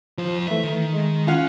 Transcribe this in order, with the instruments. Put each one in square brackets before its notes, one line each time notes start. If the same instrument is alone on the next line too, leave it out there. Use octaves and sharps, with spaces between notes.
[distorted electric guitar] F2 F4 [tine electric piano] F3
[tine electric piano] E3 A3 [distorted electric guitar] E5
[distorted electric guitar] D#3
[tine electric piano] G#3
[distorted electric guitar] C#4 [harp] F4 F5 F#5